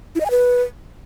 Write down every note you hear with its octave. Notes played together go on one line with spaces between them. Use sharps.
E4
D#5
G#5
B4